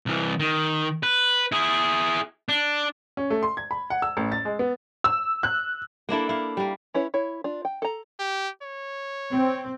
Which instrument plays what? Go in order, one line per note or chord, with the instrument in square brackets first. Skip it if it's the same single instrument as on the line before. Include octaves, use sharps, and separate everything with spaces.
[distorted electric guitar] C2 E3
D#3
B4
E4 G#4
D4
[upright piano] C#4
A3
C6
G#6
B5
F#5
E6
A1
A6
G#3
B3
[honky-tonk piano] E6
F#6
[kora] A#3 D4 E4 A4
E4 F5
G3 A#3
[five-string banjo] C#4 E4 B4 C#5
E4 C#5
D4 F4
G5
A4 A#5
[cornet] G4
C#5
[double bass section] C4